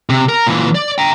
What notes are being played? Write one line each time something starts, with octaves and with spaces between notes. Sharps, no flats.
C3
A#4
A#2 E3
D5
G5 A#5